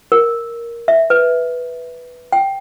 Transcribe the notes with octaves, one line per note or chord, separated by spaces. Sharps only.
A#4
E5
B4
G5